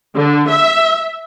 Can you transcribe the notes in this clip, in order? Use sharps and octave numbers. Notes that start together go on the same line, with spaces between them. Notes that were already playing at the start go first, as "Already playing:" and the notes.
D3
E5